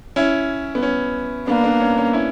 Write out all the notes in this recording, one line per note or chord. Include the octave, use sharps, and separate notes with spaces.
C#4 E4
B3
C#4
A#3 B3 D4
B3 D4
C#4
C#4
C#4 E4